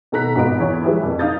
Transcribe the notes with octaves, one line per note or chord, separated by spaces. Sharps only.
B2 D#3 A4 A#5 F#6 B6
G#1 B3 F4 D#5 D7
E2 E3 C#5
E3 F3 G#3 G4 B4 E5
F2 A#2 E3
D#4 F5 A#5 D#6 G6 A6